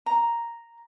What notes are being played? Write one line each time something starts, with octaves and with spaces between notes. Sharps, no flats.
A#5